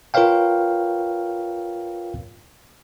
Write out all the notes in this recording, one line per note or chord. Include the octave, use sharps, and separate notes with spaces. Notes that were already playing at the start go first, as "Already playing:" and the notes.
F4 A#4 B4 C#5 F5 G5